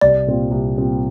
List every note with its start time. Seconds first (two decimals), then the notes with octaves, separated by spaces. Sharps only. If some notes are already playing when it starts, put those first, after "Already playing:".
0.01 C2 D5
0.26 A#2 G3 C4 F4
0.51 C2
0.76 A#2 G3 C4 F4